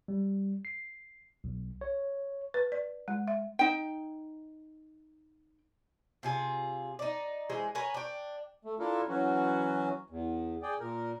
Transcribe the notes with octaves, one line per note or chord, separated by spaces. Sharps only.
G3
C7
B1
C#5
B4
D5
G#3
E5
D#4 G5
C3 F4 G#4
D#4 D5
E3 G#3 G#4 C5
A#4 B4 C#5 G#5
D4 G5
A3
D4 E4 F4 A4 A#4
E3 F#3 C#4 F#4
E2
G#4 D5 G5
A#2 A#4